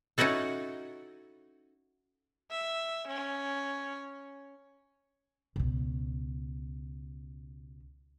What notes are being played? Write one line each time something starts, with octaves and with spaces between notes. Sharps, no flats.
C#4 D#4 E4 F#4 A4
E5
C#4
C#2 B2